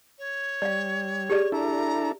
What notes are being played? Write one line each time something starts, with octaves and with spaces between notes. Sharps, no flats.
C#5
G3 D5 F5
G4 G#4 D5
D4 E4 A4 A#5